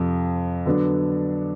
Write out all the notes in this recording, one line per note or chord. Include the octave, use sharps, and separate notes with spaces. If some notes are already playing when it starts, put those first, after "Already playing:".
Already playing: F2 C3 F3
D3 F#3 B3 D4